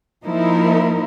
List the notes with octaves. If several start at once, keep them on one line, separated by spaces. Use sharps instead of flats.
F3 A#3 D#4 E4 A#4